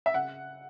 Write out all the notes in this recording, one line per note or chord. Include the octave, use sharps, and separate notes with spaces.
E5
C#3 F#5